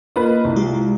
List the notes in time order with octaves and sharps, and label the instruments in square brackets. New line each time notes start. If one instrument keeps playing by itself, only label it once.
[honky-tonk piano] A#3 F4 B4 [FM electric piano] D#5
[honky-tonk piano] C2
[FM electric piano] G#3 F4 G4